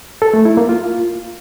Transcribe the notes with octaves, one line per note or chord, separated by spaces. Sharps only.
A4
A3
E4
A#3
F4